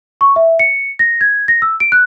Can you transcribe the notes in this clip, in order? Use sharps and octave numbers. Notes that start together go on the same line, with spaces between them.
C#6
E5
C#7
A#6
G#6
A#6
E6
D7
F#6